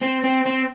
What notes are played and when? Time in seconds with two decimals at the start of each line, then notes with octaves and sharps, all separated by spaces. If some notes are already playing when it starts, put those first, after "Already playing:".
0.02 C4
0.24 C4
0.46 C4